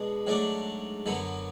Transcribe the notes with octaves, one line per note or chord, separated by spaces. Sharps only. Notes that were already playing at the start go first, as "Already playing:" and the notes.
Already playing: B2 G#3 B3 D4
G#2 F#3 A3 D4
F#2 D3 F#3 B3